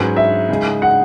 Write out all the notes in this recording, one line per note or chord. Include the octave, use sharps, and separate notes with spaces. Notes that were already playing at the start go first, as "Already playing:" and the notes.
Already playing: G#2 F#3 C#4 G#4 B4
E5
C#3 G#3 D#4 G#4
F#5